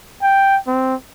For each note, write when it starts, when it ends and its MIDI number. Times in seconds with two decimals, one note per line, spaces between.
0.22 0.58 79
0.67 0.95 60